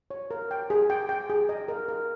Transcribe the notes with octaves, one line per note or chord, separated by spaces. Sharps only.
C#5
A#4
G5
G#4
G5
G5
G#4
D#5
A#4
A#4